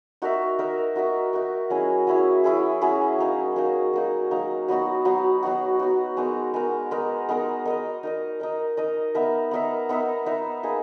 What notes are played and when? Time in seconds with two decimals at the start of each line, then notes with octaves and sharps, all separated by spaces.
0.22 D#4 F#4 A#4 E5
0.59 D#4 F#4 A#4 E5
0.95 D#4 F#4 A#4 E5
1.33 D#4 F#4 A#4 E5
1.70 F#3 C#4 E4 G#4
2.07 F#3 C#4 E4 G#4
2.44 F#3 C#4 E4 G#4
2.81 F#3 C#4 E4 G#4
3.19 F#3 A#3 D#4
3.56 F#3 A#3 D#4
3.93 F#3 A#3 D#4
4.31 F#3 A#3 D#4
4.68 F#3 B3 D#4 F#4
5.05 F#3 B3 D#4 F#4
5.43 F#3 B3 D#4 F#4
5.79 F#3 B3 D#4 F#4
6.17 G#3 B3 D#4 A#4
6.54 G#3 B3 D#4 A#4
6.91 G#3 B3 D#4 A#4
7.29 G#3 B3 D#4 A#4
7.65 D#4 A#4 D#5
8.03 D#4 A#4 D#5
8.40 D#4 A#4 D#5
8.77 D#4 A#4 D#5
9.15 B3 D#4 A#4 E5
9.51 B3 D#4 A#4 E5
9.89 B3 D#4 A#4 E5
10.26 B3 D#4 A#4 E5
10.63 A#3 D#4 G#4